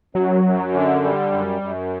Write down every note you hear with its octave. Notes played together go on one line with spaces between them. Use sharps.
F#2 F#3
F#2
D3
G3
F#2
F#2